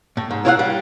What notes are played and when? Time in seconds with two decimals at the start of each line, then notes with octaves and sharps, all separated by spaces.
0.17 A2
0.31 G#2
0.45 E4 F4 C#5 D#5 F5 F#5
0.59 G3